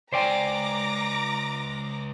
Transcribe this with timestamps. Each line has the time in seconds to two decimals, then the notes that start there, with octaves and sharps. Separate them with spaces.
0.13 C#2 C5 D5 G5 G#5 A#5 D6 A#6